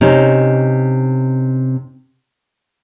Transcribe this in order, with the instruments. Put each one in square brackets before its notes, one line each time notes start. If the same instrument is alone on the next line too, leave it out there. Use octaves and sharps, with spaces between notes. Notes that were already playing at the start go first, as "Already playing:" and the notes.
[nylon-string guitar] C3 C#4 D#4